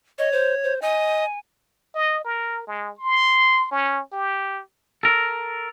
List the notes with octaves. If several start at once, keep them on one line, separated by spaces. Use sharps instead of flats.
C#5 D#5
C5
C5
D#5 G#5
D#5
A#4
G#3
C6
C#4
G4
A4 A#4